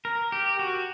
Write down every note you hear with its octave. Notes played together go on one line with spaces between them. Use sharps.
A#4
G4
F#4